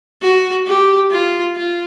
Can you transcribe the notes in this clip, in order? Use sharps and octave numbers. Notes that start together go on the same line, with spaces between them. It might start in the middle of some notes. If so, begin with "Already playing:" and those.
F#4
G4
F4
F4